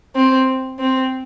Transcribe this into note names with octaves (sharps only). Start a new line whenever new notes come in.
C4
C4